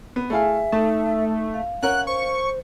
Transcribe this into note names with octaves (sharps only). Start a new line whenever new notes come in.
B3
A3 E4 G#4 E5 F5 G#5
A3 D#4 A5
F5
C#4 A#4 F#5 F#6
C5 C#6